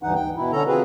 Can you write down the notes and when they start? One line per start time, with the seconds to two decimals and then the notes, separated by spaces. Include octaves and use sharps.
0.03 D2 G2 E3 D#4 F#5
0.15 G5
0.37 B2 E4
0.52 D3 C#4 A4 A#5
0.67 F3 C4 F#4 G#4 B4